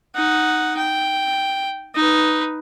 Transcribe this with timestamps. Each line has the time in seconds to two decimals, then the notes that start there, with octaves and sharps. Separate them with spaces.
0.16 D#4 F#5
0.77 G5
1.95 D#4 B4